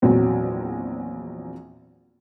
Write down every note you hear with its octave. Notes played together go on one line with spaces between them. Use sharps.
A#1 E2 F#3 C4